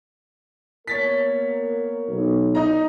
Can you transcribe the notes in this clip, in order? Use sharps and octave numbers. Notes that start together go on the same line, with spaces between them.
A#3 B3 A#4 C#5 A6 B6
B1
D#4 D5 A#5